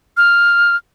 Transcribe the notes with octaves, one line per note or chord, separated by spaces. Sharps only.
F6